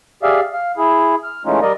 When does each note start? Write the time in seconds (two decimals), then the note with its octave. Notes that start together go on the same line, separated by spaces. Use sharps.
0.23 G4 G#4 D5 E5 F5
0.53 F5
0.77 E4 G#4
1.24 F6
1.45 E3 G#3 A3 C#4 D#4 F4
1.62 G3 A#4 D5 D#5